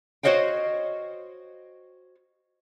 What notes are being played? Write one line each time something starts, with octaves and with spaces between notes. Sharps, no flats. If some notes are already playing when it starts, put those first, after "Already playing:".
F#4 C5 C#5 D#5 F5 G5